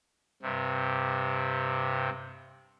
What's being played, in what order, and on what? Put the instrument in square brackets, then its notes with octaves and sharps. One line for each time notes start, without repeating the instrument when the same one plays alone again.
[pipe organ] G2 C3